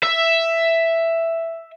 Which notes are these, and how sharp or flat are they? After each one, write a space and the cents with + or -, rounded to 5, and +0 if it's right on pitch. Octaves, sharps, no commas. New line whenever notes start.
E5 +5